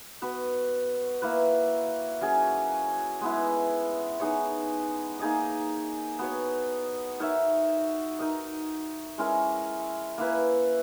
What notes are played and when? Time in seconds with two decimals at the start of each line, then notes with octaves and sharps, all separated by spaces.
0.22 B3 F#4 B4
1.22 A#3 E4 B4
2.21 F#3 C#4 G#4
3.21 G#3 B3 E4
4.20 B3 D#4 G#4 C#5
5.19 A#3 D#4 G#4 D#5
6.19 B3 F#4 C#5
7.20 D#4 A#4 C#5 E5
8.19 D#4 A#4 D#5
9.18 G#3 C#4 E4 A#4
10.18 A#3 E4 B4